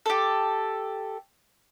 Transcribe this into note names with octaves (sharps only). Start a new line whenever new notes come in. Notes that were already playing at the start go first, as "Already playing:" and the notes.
G4 A4